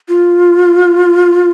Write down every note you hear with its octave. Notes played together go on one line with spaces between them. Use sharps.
F4